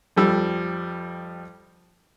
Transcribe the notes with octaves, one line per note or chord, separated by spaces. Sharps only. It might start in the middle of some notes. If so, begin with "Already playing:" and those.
F2 F3 G3 E6